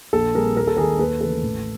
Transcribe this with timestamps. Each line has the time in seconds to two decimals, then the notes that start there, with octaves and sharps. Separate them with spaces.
0.13 A#1 A4
0.35 A#2 G3 C4 G#4 A#4
0.57 D#2 A#4
0.67 A4
0.77 D#3 G#3 G#4 A#4
0.99 D#2 A4 B4
1.21 C#3 E3 A3 A4 B4
1.43 A1